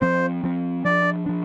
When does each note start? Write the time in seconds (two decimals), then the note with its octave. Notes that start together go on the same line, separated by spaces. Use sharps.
0.01 F3 C4 C5
0.44 F3 C4
0.85 F3 D4 D5
1.26 F3 D4